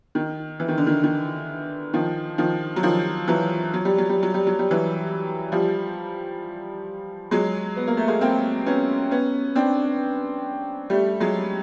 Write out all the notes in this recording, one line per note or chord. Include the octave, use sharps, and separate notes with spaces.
D#3
E3
D#3
D3
D#3
D#3
D#3 F3
D#3 F3
F#3
D#3 F3
E3 F#3
F#3
G3
F#3
G3
F#3
G3
F#3
G3
E3 F#3
F3 G3
F#3 G#3
B3
A#3
A3
G#3 A#3
A#3 C4
B3 C#4
B3 C#4
C4 D4
G3 A3
F#3 G#3